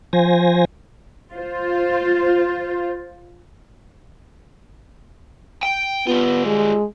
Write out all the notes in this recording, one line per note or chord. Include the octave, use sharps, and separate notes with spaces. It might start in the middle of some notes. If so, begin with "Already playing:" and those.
F3 C5 G#5 A#6
F4 C5
G5
G3 B3 F4
G#3